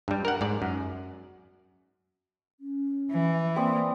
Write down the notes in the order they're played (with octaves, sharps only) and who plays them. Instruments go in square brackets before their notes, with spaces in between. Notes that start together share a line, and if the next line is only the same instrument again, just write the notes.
[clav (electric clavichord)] G2 G3
A#4 F#5
G#2 D5
F#2
[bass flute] C#4
[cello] E3
[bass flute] A#3 [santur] C4 D5 D#6